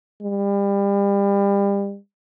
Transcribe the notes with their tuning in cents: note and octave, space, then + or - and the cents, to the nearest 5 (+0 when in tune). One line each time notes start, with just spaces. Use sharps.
G3 +30